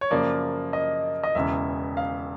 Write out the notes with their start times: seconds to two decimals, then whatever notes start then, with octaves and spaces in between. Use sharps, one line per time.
0.01 C#5
0.11 F#2 C#3 F3 A#3 D5
0.73 D#5
1.23 D#5
1.35 E1 E2 C#3 E5
1.97 F5